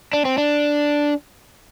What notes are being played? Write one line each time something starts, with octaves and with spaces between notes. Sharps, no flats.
D4
C4
D4